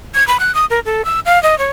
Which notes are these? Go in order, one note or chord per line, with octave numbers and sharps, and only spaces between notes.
G#6
B5
F#6
D#6
A#4
A4
E6
F5
D#5
C#5